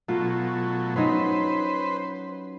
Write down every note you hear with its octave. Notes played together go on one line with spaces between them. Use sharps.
B2 F#3 A3 F4
F#3 C#4 D#4 B4 C5